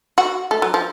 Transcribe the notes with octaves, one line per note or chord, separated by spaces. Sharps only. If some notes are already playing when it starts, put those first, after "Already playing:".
F#4
A3
F#3
F3